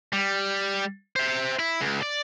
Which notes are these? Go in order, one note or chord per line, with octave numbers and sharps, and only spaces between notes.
G3
C5 E5
E4
C#2
D5